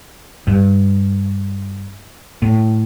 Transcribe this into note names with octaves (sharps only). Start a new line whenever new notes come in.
G2
A2